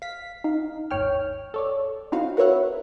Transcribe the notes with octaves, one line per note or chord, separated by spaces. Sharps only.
F5 B6
D#4 F5
G#1 D#2 C#5 G5 F6
A4 C#5 D5
C4 D#4 E4 F#4 F5
F#4 A#4 B4 C#5 E5 F#5